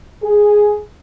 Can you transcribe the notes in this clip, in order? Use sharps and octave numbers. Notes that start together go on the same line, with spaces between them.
G#4